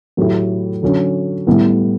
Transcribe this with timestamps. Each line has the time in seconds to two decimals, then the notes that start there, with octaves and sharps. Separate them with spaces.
0.17 A2 F#3 A3 E4 G4
0.83 D3 F#3 C#4
1.47 A2 G3 B3 E4